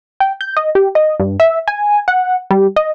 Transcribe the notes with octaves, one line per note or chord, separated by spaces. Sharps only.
G5
G6
D#5
G4
D#5
G2
E5
G#5
F#5
G3
D#5